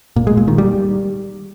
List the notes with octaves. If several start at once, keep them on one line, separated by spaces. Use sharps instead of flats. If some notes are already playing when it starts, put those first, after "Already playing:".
A#2
G#3
A#2
D#3
G3